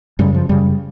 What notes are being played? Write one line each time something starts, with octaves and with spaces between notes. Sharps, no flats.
F#2 C#3 G3
F3
F#2 C#3 G3